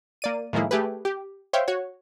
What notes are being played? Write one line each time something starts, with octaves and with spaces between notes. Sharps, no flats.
A#3 D5 D#7
A2 D#3 F3 G#3 A#3 E4
A3 G4 G#4 B4
G4
C5 C#5 E5 F5 G5
F#4 C#5